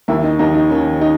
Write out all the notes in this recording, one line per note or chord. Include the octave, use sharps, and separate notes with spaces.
D#2 E4
D#4
D#2 D#4
D#4
D#3 C#4
D#4